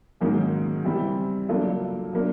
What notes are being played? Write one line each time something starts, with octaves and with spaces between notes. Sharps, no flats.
G#2 D#3 F#3 A#3 C#4
E3 G3 C4
F#3 A#3 D4 F4 A4
F#3 A#3 D4